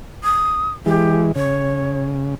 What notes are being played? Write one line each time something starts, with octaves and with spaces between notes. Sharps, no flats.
D#6
E3 G#3 G4
C#3 C#5